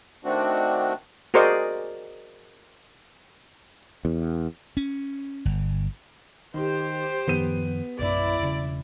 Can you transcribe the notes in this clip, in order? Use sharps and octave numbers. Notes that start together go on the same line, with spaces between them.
D#3 A3 C4 D4 F#4
F#4 G#4 A#4 C5 D5 D#5
E2
C#4
G1
D#3 G4 C5
F#2 D#3 F3 B3 D#7
A#1 F#2 E4 D5
E1 C#3